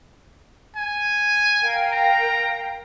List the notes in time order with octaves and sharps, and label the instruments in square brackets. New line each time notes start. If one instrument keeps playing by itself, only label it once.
[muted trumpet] G#5
[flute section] A#4 F5 G5
[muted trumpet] A#5